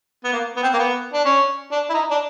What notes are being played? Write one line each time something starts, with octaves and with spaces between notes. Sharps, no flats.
B3
A#3
B3
C4
A#3
B3
D4
C#4
D4
E4
D#4
D4